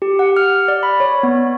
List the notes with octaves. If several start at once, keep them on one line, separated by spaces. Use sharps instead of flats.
G4
F#5
F6
D5
B5
C#5
B3